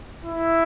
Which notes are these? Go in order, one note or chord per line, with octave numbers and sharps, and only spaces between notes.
E4